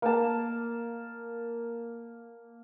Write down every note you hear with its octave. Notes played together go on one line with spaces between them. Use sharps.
A#3 A5